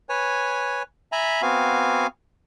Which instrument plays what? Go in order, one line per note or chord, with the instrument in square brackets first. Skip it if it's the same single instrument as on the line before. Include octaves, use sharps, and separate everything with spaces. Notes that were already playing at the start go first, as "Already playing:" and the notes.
[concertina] B4 C#5 G#5
E5 G#5 A#5 B5
B3 C4 F#4 F5 G#5